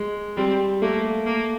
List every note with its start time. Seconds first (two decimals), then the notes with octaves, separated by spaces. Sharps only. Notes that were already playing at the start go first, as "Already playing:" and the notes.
Already playing: G#3
0.37 G3 C4
0.82 A3 A#3
1.26 A#3